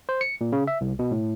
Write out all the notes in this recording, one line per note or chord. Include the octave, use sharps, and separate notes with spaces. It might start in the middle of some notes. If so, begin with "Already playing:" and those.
C5
C#7
A#2
C#3
E5
C2
B2
A2